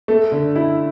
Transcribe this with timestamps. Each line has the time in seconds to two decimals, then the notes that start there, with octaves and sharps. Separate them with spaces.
0.08 A3
0.32 D3
0.56 E4